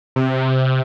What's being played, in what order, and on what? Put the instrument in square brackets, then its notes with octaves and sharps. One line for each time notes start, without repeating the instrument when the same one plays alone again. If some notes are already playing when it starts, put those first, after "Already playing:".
[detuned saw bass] C3